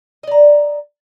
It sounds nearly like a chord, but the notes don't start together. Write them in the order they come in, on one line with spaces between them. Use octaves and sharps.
D#5 D5 A#5